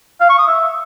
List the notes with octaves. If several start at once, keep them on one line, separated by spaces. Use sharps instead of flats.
F5
C#6
D#6
E5